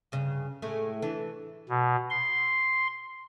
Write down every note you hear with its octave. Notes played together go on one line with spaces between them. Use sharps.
G2 C#3
A2 G#3 A3
E3 D4
B2
C6